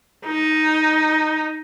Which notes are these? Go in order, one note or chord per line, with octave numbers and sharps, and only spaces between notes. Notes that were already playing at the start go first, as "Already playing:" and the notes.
D#4